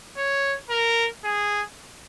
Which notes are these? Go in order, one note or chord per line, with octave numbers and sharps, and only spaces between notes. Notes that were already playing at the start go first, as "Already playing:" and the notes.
C#5
A#4
G#4